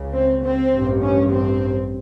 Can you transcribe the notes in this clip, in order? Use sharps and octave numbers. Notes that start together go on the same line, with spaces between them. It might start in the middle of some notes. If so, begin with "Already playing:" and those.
Already playing: C#2 C#3
C4
C4
A1 G2
C#4
C4